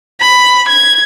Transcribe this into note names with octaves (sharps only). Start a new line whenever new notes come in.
B5
G#6